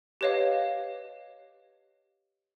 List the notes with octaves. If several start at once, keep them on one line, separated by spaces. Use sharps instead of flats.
G4 B4 C#5 D#5 F5